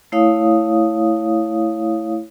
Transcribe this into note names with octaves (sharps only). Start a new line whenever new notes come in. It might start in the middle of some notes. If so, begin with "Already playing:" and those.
A3 E4 C#5 F5 D#6